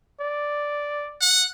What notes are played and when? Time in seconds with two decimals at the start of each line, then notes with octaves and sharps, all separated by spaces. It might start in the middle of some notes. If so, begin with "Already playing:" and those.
0.21 D5
1.21 F#5